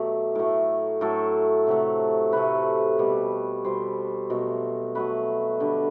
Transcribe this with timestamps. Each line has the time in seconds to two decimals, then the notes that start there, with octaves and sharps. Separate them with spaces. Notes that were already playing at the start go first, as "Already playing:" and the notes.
Already playing: B2 F#3 A3 G4
0.35 A2 F#3 A3
1.01 A2 F#3 A3 A4
1.67 C3 F#3 A3
2.32 C3 F#3 A3 B4
2.99 B2 G3
3.65 B2 G3 C5
4.30 B2 F#3 A3
4.95 B2 F#3 A3 B4
5.60 D3 G3